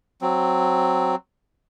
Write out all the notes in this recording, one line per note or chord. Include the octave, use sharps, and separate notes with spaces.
F#3 C4